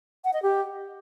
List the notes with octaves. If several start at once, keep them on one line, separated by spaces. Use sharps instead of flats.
F#5
D#5
G4